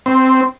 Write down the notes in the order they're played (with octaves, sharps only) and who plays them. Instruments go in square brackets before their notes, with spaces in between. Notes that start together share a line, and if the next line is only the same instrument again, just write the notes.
[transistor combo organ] C4